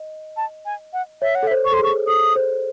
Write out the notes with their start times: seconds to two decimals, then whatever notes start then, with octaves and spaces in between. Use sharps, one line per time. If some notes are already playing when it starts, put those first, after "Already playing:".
Already playing: D#5
0.37 A5
0.66 G#5
0.93 F#5
1.22 C#5 E5
1.35 F#5
1.43 A4
1.47 E5
1.51 C5
1.65 C#6
1.72 A4 C6
1.79 G#4
1.84 C#6
2.07 A4 D#6
2.36 C5